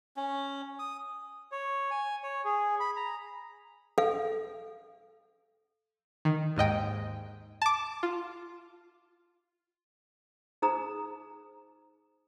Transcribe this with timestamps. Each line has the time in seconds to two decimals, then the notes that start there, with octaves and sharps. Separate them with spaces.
0.16 C#4
0.79 D#6
1.52 C#5
1.91 G#5
2.23 C#5
2.45 G#4
2.80 B5
2.96 A#5
3.98 A4 F5
6.25 D#3
6.56 D#2 G#2 D#5 G5
7.62 A5 D6
8.03 F4
10.62 D#4 G#4 C5 A#5 D#6